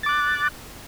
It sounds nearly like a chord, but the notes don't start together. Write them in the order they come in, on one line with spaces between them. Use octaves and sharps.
A6 D6 F#6